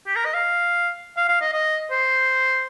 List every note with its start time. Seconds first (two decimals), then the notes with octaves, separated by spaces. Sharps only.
0.07 G4
0.16 A#4
0.25 D#5
0.34 F5
1.17 F5
1.29 F5
1.42 D#5
1.53 D#5
1.91 C5